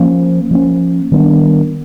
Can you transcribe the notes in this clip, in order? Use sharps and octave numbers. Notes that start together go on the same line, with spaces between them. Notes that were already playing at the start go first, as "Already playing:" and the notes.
Already playing: F3 A#3 C#4
F3 A#3 C#4
D#3 G3 B3 D4